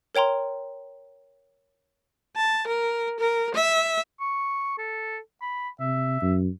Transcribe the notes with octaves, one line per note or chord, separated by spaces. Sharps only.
A#4 C#5 G5 A#5 C6
A5
A#4
A#4
E5
C#6
A4
B5
C3 E5
F#2